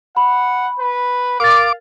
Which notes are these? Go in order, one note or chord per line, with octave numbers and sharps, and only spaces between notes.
F#5 B5
B4
A#4 F5 D6 A6